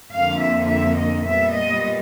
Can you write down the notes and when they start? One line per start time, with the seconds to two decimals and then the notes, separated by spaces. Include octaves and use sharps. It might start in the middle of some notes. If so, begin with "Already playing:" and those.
0.13 F2 D3 F3 A#3 F5
0.41 E5
0.70 E5
0.98 D#5
1.26 A#2 G3 B3 E5
1.55 D#5